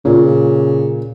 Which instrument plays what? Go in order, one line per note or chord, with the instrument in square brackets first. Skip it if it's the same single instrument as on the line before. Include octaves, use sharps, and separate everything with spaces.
[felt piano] A#2 [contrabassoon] C#3